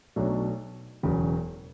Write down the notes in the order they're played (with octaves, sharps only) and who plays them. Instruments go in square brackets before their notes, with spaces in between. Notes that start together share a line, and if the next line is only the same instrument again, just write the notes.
[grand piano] B1 B2 F#3 A3 D4
E1 E2 C#3 F#3